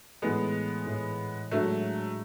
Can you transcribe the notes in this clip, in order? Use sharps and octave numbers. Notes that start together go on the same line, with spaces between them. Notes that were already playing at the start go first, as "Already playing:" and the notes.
A2 E3 G#3 A3 B3
A2 E3 A3
A2 F#3 G#3 A3 D4